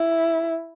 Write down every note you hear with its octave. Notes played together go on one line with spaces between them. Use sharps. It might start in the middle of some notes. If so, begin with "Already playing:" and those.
Already playing: E4